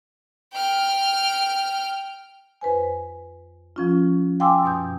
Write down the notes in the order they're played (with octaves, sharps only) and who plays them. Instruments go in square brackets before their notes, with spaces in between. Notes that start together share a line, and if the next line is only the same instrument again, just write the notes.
[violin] G5 F6
[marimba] F2 B4 C5 G#5
F3 C#4 F4
F5 G5 G#5 C6 D6 E6
F#2 B2 D#6 G6